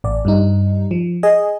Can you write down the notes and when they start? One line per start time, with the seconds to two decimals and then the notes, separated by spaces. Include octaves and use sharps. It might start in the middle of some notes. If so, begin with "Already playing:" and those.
0.04 A1 D5
0.25 G2 G3 D#4
0.91 F3
1.23 G#4 D#5 G#5